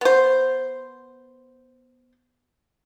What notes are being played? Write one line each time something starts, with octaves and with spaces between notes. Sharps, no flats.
B3 C5